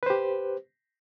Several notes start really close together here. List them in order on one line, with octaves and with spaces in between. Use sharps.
B4 C5 G4